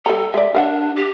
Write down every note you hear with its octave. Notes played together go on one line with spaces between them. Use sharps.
G3 A4 A#5
G#3 D5 E5
D4 A#4 F5 F#5
G4